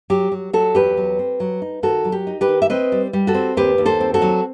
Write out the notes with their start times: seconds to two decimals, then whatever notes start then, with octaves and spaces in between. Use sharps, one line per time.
0.10 F#3 G4
0.32 F#3
0.53 F#3 F#4 A4
0.75 E2 G4 B4
0.97 F#3
1.19 C4
1.40 F#3
1.62 D#4
1.83 D#3 F#4 A4
2.04 F#3
2.12 G4
2.27 D#4
2.41 G4 B4
2.48 D#3
2.62 E5
2.70 C4 B4 D#5
2.92 G3
3.13 G3
3.27 F#4 A4
3.34 C4
3.57 D#2 G4 B4
3.78 D#2
3.86 A4 C5
4.00 C4
4.14 F#4 A4
4.22 F#3